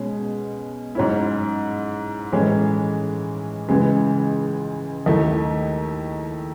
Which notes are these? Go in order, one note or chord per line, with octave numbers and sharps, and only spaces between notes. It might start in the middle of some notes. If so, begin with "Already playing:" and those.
Already playing: B2 G#3 C#4
G#2 F#3 C#4 E4
A2 E3 G#3 C#4
C#2 C#3 E3 G#3
D#2 D#3 A3 E4